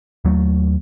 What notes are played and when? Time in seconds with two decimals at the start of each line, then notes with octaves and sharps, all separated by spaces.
0.25 D#2 F#3 A3